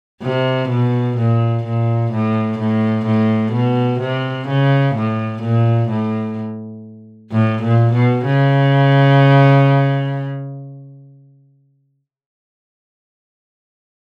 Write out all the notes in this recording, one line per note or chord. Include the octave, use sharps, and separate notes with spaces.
C3
B2
A#2
A#2
A2
A2
A2
B2
C3
C#3
A2
A#2
A2
A2
A#2
B2
C#3